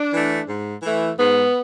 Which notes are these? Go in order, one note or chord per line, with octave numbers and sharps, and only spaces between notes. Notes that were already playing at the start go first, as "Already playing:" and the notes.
Already playing: D4
E3 A3
G#2
E3 A3
G#2 B3